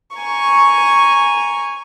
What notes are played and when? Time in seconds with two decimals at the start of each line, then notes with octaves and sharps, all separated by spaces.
0.17 G#5 A#5 C#6